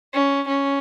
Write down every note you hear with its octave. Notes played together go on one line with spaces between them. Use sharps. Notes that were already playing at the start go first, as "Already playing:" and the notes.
C#4
C#4